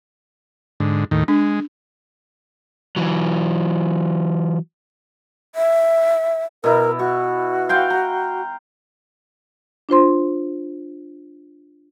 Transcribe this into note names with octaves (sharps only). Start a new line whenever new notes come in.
G#2 D3
D#2 A2 D#3
G#3 D4
E3 F#3
E5
B2 E4 A#4
F#4 C#6
F5 G5 C6
A#5
D4 F4 C5 C6